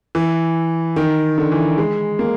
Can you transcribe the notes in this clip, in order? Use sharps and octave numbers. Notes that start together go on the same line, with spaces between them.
E3
D#3
D3
E3
G#3
A#3